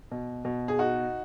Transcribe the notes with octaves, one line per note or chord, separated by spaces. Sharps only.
B2
B2
G#4
D#4 F#4